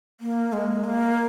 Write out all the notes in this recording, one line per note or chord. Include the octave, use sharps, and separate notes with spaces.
A#3
G#3
A#3